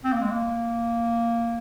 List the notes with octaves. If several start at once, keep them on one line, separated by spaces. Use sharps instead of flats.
C4
A#3
G#3
A#3